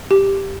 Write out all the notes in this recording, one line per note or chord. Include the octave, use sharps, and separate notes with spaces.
G4